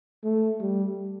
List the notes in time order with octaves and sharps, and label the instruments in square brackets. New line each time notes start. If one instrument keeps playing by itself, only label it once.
[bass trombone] A3
G3